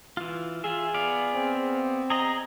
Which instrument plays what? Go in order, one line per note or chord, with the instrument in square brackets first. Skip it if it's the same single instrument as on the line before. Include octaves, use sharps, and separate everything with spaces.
[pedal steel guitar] E3 F4
[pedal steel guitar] F4 E5 [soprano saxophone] G#4
[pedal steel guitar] B3 D5 F5
[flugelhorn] C4
[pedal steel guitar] G#4 D#5 [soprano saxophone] A#5